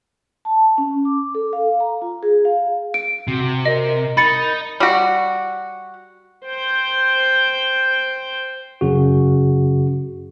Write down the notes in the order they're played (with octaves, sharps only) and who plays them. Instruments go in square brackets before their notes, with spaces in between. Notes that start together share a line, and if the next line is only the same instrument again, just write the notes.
[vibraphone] A5
C#4
D6
A4
F5
A#5
F4
G#4
F5
[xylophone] D7
[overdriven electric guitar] C3 [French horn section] F#4
[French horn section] A#4 [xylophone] D#5
[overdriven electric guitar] D#4 [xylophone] B5 A6 C#7
[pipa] G3 F#4
[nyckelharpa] C5 G5
[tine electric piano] F#2 C#3 F#4